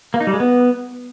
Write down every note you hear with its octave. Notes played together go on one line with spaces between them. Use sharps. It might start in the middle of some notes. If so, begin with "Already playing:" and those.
A#3
D#4
G3
G#3
B3